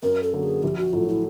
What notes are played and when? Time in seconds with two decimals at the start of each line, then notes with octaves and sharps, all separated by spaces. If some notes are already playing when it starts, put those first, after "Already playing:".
0.02 F#2 A#4
0.23 A4
0.33 D3 F#3 A#3
0.43 G#4
0.63 A#1 G4
0.78 F#4
0.93 A2 F#3 A3 F4
1.09 E4